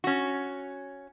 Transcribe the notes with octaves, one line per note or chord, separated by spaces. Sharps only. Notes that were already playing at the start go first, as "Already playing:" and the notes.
C#4 F#4